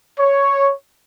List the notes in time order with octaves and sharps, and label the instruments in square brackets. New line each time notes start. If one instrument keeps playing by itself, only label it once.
[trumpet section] C#5